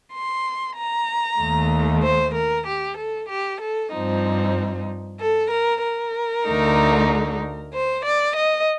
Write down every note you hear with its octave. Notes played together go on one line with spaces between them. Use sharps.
C6
A#5
D#2 D#3 A3
C5
A#4
G4
A4
G4
A4
G2 F3 C4 D#4
A4
A#4
A#4
D2 D3 A3 D#4
C5
D5
D#5